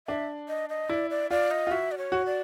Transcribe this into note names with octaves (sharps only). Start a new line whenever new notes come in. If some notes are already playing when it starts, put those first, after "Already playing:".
D4 E5
D#5
D#5
E4 D5
D5
F4 D5
D#5
F4
F#4 E5
D5
C#5
F#4
D5